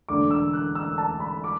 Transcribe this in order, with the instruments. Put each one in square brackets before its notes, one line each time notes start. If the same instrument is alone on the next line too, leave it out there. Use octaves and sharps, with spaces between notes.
[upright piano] E1 D2 D3 D6
E6
F#6
E6
A5
B5
D6